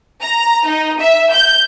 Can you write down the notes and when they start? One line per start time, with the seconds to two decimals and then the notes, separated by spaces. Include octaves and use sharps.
0.22 A#5
0.67 D#4
1.00 E5
1.33 G6